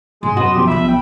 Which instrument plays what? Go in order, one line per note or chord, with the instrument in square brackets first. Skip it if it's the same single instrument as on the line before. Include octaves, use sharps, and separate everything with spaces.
[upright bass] G#2 [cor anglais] G#3 [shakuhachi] C6
[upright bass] F#2 [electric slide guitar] F#4 B4 [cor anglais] D#5
[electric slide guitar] B2 F3 [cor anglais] G4
[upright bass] B1 G3 [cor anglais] E5 [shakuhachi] B5
[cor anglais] G5